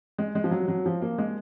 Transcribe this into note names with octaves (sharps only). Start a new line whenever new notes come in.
G#3
G#3
F3
F#3
F#3
F3
A#3
G#3